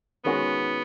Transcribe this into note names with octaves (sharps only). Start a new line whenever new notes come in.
D#3 G#3 B3 C#4 F#4